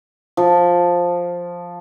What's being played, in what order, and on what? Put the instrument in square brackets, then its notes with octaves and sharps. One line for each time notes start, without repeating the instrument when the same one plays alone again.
[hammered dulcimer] F3